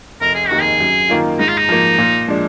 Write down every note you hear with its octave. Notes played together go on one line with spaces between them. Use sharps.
F1 A#4
G#4
D#2 D#3 F#4
G#4
F#2
D#3 A#3 F4
G#2 D#4
F4
D#4
F3 A#3
A#2
F3 G#3 D4